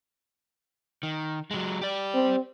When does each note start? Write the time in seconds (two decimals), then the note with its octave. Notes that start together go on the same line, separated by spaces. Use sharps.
1.03 D#3
1.51 F#3 G#3
1.81 G4 D5
2.15 C4